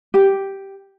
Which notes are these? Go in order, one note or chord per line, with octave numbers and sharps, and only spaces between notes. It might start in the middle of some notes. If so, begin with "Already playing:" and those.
G4